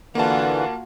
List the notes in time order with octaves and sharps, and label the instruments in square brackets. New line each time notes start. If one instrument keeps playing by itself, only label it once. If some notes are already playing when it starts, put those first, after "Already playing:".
[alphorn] D3 [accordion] E3 [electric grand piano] A#3 A5 [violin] F4 F#4